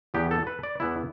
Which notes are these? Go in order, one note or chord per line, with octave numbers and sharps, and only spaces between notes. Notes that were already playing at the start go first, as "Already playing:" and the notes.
E2 E3 B3 G4
A4
B4
D5
E2 E3 B3 E4